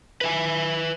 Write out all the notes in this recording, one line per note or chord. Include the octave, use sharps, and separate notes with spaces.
B4 E5 G#5